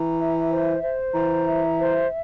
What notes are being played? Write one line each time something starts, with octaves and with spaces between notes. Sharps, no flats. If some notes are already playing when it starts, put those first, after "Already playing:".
Already playing: E3 A#5
E5
C5
C5
E3 A#5
E5
C5